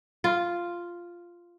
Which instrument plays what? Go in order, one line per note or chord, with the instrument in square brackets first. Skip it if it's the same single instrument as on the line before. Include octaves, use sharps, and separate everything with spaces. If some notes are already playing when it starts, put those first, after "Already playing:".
[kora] F4